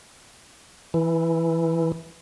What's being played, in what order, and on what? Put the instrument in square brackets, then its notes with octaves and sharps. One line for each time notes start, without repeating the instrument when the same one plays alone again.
[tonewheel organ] E3